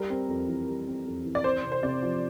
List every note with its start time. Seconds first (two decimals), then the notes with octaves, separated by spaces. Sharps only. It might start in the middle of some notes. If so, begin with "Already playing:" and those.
Already playing: G3 A#4
0.10 C4
0.28 F2
0.48 E3
0.68 G3
0.87 C4
1.06 F2
1.25 E3
1.35 D5
1.44 C4 C5
1.64 C3
1.72 C5
1.82 C3 D5
2.02 F3